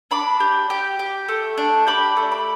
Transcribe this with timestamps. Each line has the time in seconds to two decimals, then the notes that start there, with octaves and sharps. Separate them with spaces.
0.11 D4 B5 D6
0.40 G4
0.70 G4
0.99 G4
1.28 A3
1.58 D4
1.87 G4 B5 D6
2.17 A3
2.31 B5 D6